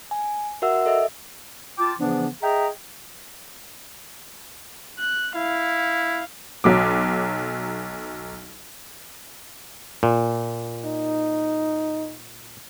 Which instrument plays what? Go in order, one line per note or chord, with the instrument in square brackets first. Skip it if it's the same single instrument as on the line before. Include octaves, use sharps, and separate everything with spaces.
[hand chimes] G#5
F#4 A#4 E5 F#5 E6
A4 D#5 E5
[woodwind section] F4 G5 A5 D6
C#3 E3 F3 B3 D4
G#4 D#5 E5 G5 A#5
[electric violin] F#6
[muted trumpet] E4 [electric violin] F5
[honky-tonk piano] B1 F#3 D6
[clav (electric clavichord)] A#2
[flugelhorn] D#4